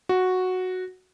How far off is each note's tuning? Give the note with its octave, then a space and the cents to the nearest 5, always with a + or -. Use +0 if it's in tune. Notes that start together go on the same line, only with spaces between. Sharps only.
F#4 -5